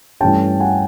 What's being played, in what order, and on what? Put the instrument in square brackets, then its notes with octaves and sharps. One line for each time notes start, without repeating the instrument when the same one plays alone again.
[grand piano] G2 E3 A3 C#4 G5 A5
F#5 G#5